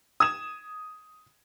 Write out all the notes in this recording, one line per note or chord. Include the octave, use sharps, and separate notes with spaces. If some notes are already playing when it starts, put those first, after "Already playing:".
D#6 G#6 E7